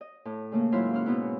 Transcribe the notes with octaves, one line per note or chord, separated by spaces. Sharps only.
D#5
A2
C#3 A3 A#3
G#2 F#3 E4 F4 E5 F5
C#4 E4 F6 F#6
G#2 B2 B3 E4